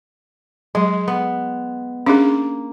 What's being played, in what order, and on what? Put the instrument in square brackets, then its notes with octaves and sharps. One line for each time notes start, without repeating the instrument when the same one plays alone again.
[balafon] F#3 [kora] G#3
[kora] B3
[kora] A#3 [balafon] C#4 D4 G#4